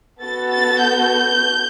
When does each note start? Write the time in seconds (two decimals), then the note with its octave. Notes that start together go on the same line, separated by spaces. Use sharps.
0.22 B3 F#4 A4 A6
0.52 A6
0.83 G6